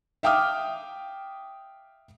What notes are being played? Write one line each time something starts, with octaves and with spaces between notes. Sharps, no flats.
E5 F5 G5 D6 D#6 F6